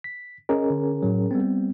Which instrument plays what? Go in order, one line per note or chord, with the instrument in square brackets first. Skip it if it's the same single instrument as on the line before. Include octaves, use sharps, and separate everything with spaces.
[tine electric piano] B6
[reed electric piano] C#4 G#4 A#4 [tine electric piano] D#5
[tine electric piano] D3
A2 F#3
G3 B3 C4